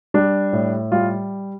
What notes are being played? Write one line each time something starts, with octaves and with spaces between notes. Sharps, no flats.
G3 D4
A2
G3 F4